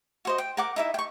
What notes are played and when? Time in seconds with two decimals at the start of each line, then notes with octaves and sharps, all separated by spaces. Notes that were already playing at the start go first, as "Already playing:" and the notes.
0.25 F#4 C5 D#5
0.38 G5
0.57 A#4 F#5 D6
0.76 D#4 E4 E5
0.94 G5 C#6